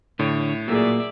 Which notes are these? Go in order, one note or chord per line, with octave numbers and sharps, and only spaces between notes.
A2 D3 C#5
A#2 F#3 A#3 G#4 D5 E5